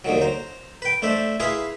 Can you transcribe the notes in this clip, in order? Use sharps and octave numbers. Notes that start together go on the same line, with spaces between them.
D#2 D3 D#3 F#3
C5 A#5
B4 G5
A3 D4 C5 E5
E4 G#4 B4 F5 C6